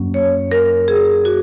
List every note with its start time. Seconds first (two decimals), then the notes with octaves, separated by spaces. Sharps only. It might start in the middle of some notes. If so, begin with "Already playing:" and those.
Already playing: F#2 F#3 A#3 C#4
0.14 C#5
0.52 A#4
0.88 G#4
1.25 F#4